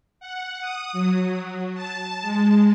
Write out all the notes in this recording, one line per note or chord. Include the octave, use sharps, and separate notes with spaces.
F#5
D#6
F#3
A5
G#3